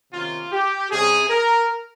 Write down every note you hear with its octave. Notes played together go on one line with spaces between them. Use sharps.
C3 D#3 A#3 C#4 F4
G4
C3 G3 C#4 G#4
A#4